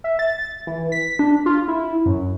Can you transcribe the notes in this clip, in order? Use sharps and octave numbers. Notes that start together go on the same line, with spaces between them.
E5
A6
E3
B6
D4
F4
E4
F#2